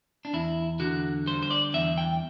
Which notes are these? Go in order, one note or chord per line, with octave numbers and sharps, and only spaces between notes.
D4
E2 E4
D3 F#4
G3 C5
C5
D5
E2 E5
G5